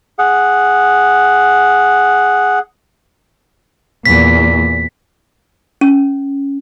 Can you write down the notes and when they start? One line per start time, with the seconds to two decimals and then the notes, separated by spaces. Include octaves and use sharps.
0.19 G#4 F#5
4.06 E2 A#2 B6
5.81 C#4